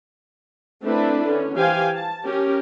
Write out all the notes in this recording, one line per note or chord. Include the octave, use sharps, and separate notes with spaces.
A3 C4 D4 E4 B4
D3 C#4
E3 G4 C5 F5 G5 G#5
A5
C#4 G4 A#4